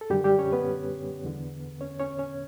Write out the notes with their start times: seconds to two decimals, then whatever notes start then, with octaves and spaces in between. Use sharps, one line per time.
0.01 A4
0.10 F#2 D3 G3 G4
0.24 G3 G4
0.39 C#4 C#5
0.52 B3 B4
1.25 E2 D3
1.81 C#4 C#5
1.99 C#4 C#5
2.18 C#4 C#5